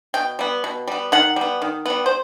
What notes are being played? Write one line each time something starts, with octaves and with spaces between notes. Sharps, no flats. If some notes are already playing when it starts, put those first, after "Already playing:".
B2 G5
G3 B3
B2
G3 B3
D#3 F#5
G3 B3
D#3
G3 B3
C5